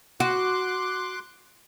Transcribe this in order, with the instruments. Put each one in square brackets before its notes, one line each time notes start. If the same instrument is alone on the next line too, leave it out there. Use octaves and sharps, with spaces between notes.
[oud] F#4 [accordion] C6 D6 F#6